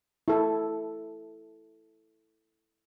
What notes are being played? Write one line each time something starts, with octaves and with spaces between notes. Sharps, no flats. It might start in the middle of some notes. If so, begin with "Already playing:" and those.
E4 A4